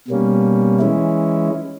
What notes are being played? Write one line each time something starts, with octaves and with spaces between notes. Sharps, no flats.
B2 G3 A#3 C#4
E3 G#3 C#4 E4